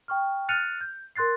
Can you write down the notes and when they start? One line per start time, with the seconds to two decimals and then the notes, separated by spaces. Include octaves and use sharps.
0.08 G5 C#6 F6
0.49 F6 F#6 A6 C#7 D#7 F7
0.81 G6
1.16 A#4 C6 F#6 A6 C7